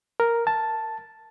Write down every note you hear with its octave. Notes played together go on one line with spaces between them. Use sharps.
A#4
A5